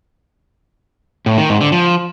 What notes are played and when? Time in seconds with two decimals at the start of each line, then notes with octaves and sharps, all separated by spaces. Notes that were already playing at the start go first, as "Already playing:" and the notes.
1.26 A2
1.38 D#3
1.49 G#2
1.61 D3
1.72 F3